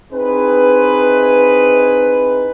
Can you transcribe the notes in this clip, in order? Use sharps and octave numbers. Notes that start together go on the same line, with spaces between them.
C4 D#4 E4 G#4 B4